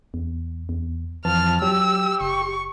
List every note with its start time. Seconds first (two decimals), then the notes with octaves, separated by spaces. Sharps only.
0.14 E2
0.69 E2
1.25 F2 E3 A5 F6
1.62 F#3 G4 E6
2.21 F#1 C#6